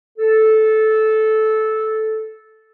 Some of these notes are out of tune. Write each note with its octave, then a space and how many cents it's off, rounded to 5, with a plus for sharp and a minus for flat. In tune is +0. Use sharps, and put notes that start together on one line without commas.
A4 -15